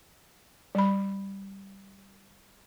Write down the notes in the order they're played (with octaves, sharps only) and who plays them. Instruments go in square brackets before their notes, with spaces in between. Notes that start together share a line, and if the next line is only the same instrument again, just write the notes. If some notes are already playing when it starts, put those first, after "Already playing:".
[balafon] G3 B5